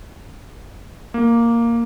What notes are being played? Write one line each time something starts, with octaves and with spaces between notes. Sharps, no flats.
A#3